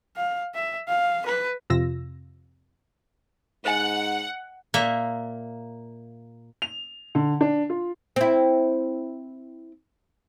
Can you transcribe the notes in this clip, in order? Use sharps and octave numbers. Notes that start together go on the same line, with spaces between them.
F5
E5
F5
B4
F2 C3 F4 E6 A#6
G#2 C5 D#5 F#5 G#5
A#2 A#3 E5
F7
D3
D4
F4
C4 E4